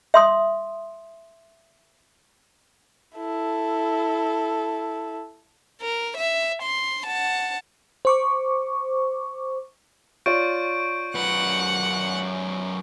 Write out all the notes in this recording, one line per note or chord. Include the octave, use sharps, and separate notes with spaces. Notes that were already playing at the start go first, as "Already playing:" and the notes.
E5 C6 D#6
E4 A4
A#4
E5
C6
F#5 A5
C5 C#6 D6
F4 C#5 D5 C#6 G6 D7
F#2 B4 F#5